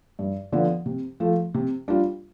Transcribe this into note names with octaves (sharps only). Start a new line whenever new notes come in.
G2
D3 F3 B3
C3
F3 A3
C3
G3 D4 F4